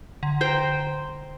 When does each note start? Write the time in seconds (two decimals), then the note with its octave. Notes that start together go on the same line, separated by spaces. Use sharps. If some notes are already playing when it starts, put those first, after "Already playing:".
0.23 D3
0.41 C5 G5 A#5